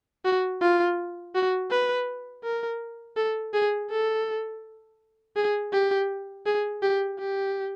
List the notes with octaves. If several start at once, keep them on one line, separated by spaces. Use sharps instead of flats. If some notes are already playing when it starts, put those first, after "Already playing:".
F#4
F4
F#4
B4
A#4
A4
G#4
A4
G#4
G4
G#4
G4
G4